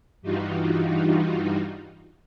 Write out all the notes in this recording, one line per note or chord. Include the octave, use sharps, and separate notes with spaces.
G2 E3 G3 D#4 F4 F#4